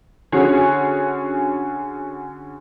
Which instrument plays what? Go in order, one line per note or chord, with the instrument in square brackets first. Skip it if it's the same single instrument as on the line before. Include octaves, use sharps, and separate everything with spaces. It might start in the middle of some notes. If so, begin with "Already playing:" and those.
[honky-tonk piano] D3 C#4 F#4 G#4 C#5